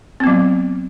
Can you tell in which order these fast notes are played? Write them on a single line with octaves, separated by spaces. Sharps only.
C4 B3 F#3